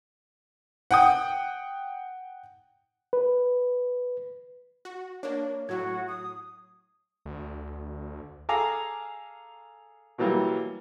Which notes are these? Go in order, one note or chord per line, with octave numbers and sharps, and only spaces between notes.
F#5 G5 D#6
B4
F#4
A#3 D4 C#5
A2 F#3 F#4 G#6
D#6
D2
G#4 A4 F5 G#5 A#5 D6
B2 E3 F#3 G3 A#3